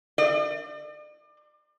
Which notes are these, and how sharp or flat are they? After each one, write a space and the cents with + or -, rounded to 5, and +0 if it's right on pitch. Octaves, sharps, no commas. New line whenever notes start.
D5 +40